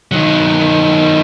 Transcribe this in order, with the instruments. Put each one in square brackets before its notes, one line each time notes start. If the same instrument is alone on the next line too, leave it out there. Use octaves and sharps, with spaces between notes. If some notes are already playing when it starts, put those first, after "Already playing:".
[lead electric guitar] D#3 F#3